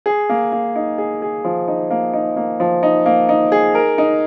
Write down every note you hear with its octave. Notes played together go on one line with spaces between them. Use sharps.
G#4
A#3
A#3
D#4
G#4
G#4
F3
D#4
A#3
D#4
A#3
F3
D#4
A#3
D#4
G#4
A#4
D#4